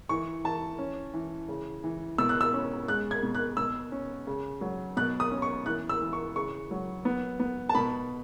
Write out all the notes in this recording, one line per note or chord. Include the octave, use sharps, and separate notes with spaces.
E3 C#6
E3 A5
C#4
E3
C#3
E3
B2 E6
F#6
E6
C#4
G#3 F#6
G#6
B2
F#6
B2 E6
C#4
C#3
F#3
B2 F#6
D#6
C#4
C#6
E3 F#6
E6
E3
C#6
C#3 C#6
F#3
B3
B3
A5
B2 B5